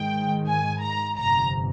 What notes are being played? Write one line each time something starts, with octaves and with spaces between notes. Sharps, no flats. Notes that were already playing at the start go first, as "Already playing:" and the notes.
Already playing: G#2 D#3 G#3 G5
G#5
A#5
G1 F2 C3 A#5